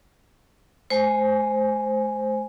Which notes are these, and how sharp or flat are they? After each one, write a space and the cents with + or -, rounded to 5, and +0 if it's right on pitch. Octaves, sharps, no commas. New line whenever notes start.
A3 -45 C5 +0 G#5 +0